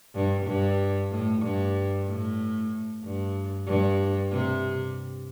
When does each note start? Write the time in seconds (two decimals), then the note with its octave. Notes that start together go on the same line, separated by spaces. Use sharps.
0.15 G2
0.47 G2
1.11 A2
1.43 G2
2.07 A2
3.04 G2
3.67 G2
4.31 C3